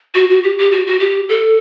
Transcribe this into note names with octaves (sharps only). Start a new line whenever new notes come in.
F#4
F#4
G4
G4
F#4
F#4
G4
A4